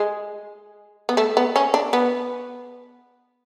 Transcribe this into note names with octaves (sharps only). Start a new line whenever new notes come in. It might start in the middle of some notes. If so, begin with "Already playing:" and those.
Already playing: G#3
B3
A3
B3
C#4
D4
B3